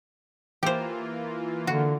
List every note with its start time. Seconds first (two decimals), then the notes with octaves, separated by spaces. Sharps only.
0.63 E3 A#3 F4 G4 C5
1.67 D3 F#4